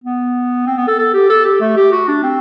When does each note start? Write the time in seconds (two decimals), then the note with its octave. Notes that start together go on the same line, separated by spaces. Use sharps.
0.04 B3
0.67 C4
0.77 B3
0.88 A4
0.99 A4
1.14 G4
1.30 A4
1.45 G4
1.60 A3
1.77 G4
1.92 F#4
2.08 D4
2.23 C4